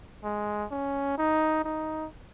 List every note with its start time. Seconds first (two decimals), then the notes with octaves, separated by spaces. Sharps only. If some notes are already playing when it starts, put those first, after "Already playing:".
0.24 G#3
0.71 C#4
1.18 D#4
1.65 D#4